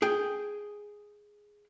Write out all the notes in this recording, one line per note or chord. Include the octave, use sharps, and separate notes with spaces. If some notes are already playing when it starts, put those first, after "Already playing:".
G#4 G5